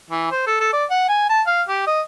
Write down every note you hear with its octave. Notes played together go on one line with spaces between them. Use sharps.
E3
C5
A4
A4
D5
F#5
G#5
A5
F5
G4
D#5